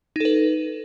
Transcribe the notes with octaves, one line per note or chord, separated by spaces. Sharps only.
D#4 A4 B4